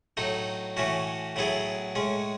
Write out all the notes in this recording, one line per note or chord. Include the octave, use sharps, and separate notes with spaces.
A2 F#3 A3 D#4
A2 E3 A3 C#4 F#4
A2 F#3 B3 E4 G#4
A2 G#3 C#4